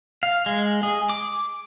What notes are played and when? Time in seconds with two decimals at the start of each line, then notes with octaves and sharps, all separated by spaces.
0.23 F5
0.46 G#3
0.83 G#4
1.09 D6